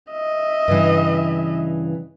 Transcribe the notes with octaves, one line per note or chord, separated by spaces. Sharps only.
D#5 E5
G2 C#3 E3